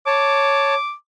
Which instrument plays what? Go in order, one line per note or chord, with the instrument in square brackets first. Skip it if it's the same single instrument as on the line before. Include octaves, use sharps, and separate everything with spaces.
[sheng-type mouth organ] C#5 A5 [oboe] D6